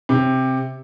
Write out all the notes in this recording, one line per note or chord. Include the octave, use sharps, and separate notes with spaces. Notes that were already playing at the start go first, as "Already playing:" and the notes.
C3